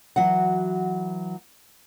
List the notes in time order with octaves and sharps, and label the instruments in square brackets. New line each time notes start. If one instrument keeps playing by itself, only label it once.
[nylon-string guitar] E3 F#3 F#4 F#5